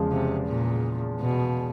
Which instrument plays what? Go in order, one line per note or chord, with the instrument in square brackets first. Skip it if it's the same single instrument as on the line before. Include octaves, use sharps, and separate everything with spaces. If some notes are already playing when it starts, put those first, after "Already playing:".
Already playing: [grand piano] E2 C#3 F3 G#3
[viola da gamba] C3
A#2
B2